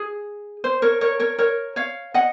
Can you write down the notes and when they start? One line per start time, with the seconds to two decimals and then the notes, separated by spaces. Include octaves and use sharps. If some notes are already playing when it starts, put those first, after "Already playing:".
Already playing: G#4
0.64 C5
0.82 A#4 C#5
1.01 A#4 C#5
1.20 A#4 C#5
1.39 A#4 C#5
1.76 C#5 F5
2.14 D#5 F#5